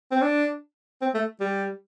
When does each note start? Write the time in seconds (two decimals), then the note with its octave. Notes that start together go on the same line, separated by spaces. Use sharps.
0.11 C4
0.22 D4
1.02 C4
1.14 A3
1.40 G3